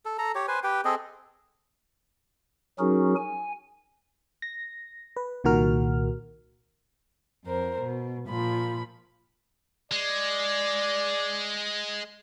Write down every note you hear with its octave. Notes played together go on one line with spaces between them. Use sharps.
A4
A4 A#5
G4 C#5
B4 C5 G#5
G4 B4 G5
C4 G#4 A4 D#5
F#3 C#4 D#4 F#4 G#4 A#4
G#5
A#6
B4
C2 A#2 D#3 F#4 A#4 F6
F2 A#4 C5
B2
A#2 F3 B5
G#3 D5